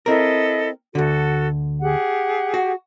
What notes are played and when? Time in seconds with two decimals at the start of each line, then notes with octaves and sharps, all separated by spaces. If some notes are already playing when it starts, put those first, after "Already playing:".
0.06 C4 E4 A4 A#4 D#5
0.95 D2 D3 F#4 A4
1.81 G4 G#4 F#5
2.54 F#4